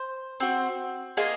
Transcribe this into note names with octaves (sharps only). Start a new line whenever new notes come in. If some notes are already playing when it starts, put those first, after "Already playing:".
Already playing: C5
C4 F#4
A#3 F4 G#4 D#5